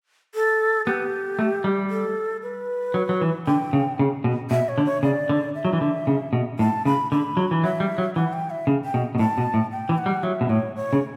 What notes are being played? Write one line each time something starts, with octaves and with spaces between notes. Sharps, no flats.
A4
B3 G4
A3
G3
A4
B4
F#3
F#3
E3
D3 G5
C#3
C#3
B2
B2 E5
C#5
D3
C#5
C#3 D5
D3
E5
F#3
E3
D3
C#3
B2
A2 A5
C#3 B5
D3 B5
F#3
E3
F#3 E5
G3
F#3
E3 F#5
G5
E5
C#3
G5
B2
B2
A2 A5
B2
A2
G5
E3
F#5
G3
F#3 E5
B2
A2 C#5
C#5
C#3